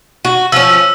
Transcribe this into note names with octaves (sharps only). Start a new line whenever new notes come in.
F#4
F3 C#4 E6